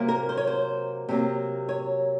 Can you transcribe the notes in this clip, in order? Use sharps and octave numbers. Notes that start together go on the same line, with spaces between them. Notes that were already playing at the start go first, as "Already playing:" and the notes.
Already playing: C3 F#3 A#3
A#4
C5
C#5
C5
C3 F#3 A#3
C#5